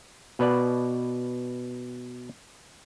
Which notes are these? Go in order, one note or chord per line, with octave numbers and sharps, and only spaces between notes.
B2 B4 D5